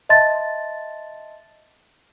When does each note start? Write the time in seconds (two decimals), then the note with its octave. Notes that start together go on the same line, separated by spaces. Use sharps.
0.09 D#5 E5 A5 C6 A6